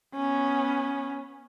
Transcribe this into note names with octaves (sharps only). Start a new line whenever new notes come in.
B3 C#4